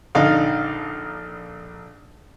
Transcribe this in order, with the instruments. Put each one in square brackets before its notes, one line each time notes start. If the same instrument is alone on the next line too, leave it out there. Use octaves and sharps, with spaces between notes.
[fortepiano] A#1 D3 D#4 F5 F6